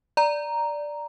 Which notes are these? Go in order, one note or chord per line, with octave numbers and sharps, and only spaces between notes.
D5 A#5